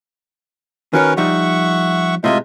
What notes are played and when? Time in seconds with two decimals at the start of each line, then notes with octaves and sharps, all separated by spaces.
0.93 D#3 C#4 F#4 A#4 B4 C#5
1.17 F3 G3 D#4 E5 F#5 C#6
2.24 A2 C3 G#3 F4 D#5 E5